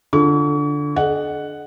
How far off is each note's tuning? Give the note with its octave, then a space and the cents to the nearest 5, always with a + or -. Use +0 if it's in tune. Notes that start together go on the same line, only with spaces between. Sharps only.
D3 +0 F4 +0 C#6 +40
A4 -45 D#5 -35 F#5 +0